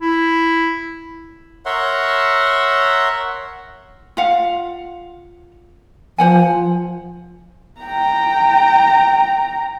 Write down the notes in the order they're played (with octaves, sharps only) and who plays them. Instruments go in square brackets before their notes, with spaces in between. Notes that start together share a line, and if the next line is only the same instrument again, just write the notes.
[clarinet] E4
[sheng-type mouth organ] A#4 C#5 E5 F#5 C6
[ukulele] F4 F5 F#5
[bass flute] F3 [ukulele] C5 F#5 G#5
[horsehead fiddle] G5 A#5